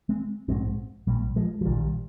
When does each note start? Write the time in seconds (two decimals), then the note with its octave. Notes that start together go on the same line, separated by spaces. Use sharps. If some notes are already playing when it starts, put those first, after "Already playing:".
0.09 G#3 C4
0.48 A#1 G#2 G#3 C4
1.07 A#1 A#2 G3 A#3
1.36 F3 G#3
1.61 F3
1.66 A#1 A#2 D#3 G3